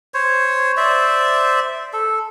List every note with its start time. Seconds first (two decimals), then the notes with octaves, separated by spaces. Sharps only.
0.14 C5 C#5
0.77 C5 D5 E5
1.93 A4